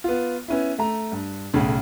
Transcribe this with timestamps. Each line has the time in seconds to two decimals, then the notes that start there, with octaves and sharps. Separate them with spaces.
0.04 B3 F4
0.48 B3 C#4 E4
0.78 A3 A#5
1.12 G2
1.54 B1 A2 C#3